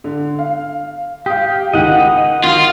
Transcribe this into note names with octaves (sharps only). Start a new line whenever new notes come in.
D3
F5
G4 F5 D#6
C#2 D#3 D#4 D#5 F#5
D#3 F4 F#4